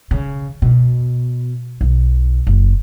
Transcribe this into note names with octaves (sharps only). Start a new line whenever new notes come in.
C#3
B2
B1
F#1